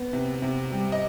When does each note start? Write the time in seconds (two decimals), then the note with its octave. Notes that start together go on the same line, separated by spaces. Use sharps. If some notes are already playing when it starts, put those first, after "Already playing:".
Already playing: B3
0.13 C3
0.42 C3
0.72 G3
0.92 D#5